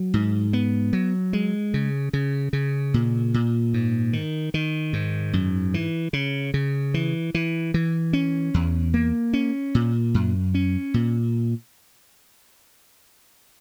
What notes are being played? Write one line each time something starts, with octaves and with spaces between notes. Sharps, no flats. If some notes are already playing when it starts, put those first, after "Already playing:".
Already playing: F#3
G#2
B3
F#3
G#3
C#3
C#3
C#3
A#2
A#2
G#2
D#3
D#3
G#2
F#2
E3
C#3
C#3
E3
E3
E3
C#4
E2
A#3
C#4
A#2
F#2
C#4
A#2